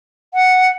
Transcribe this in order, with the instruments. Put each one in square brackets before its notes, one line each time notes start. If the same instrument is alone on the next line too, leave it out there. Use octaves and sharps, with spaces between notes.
[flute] F#5